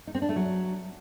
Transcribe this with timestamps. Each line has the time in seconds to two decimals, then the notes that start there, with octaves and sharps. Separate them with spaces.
0.07 D#4
0.15 C4
0.22 D4
0.29 A3
0.36 F#3